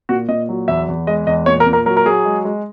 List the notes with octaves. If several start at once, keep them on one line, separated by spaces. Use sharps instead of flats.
A#2 F#4
A#2 D#5
F#3
E2 E5
E2
G#3 D#5
E2 D#5
A#2 C#5
A#4
A#2
A#4
F#3 A#4
A#4
F#3 G#4
G#3
G#3